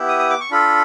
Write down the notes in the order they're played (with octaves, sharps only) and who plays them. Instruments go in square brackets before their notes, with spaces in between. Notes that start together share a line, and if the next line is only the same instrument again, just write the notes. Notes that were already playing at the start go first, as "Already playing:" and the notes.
Already playing: [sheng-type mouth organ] B3 E4 G4
D#6
D#6
D6
C#6
D4 F4 A4 B5